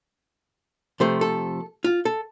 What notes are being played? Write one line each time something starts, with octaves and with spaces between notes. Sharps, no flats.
C3 F3 A3 C5
A4
F4
A4